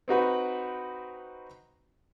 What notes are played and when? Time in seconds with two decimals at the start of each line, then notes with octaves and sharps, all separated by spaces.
0.08 C4 D#4 F#4 B4